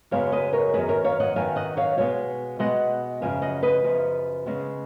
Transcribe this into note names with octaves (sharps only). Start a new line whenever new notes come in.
F#2 C#3 G#3 B3 C#5 F5
B4 D#5
A#4 C#5
F#2 D#3 F#3 B3 G#4 B4
A#4 C#5
C#5 F5
D#5 F#5
F#2 D#3 F#3 B3 F5 G#5
D#5 F#5
C#5 F5
B2 G#3 B3 C#5 F5
B2 G#3 B3 D#5 F#5
F#2 C#3 F3 B3 F5 G#5
D#5 F#5
B4 D#5
F#2 C#3 F3 B3
C#3 G#3 B3